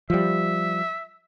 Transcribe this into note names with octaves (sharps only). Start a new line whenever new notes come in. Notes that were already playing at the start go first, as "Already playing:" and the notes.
F3 G3 E5